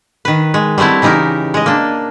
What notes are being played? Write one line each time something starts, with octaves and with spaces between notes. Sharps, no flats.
D#3 B4
G#3
G3 A3 B3 C4 E4
C#3 E3 D#4 G4 A#4
G#3 D#5
A#3 D4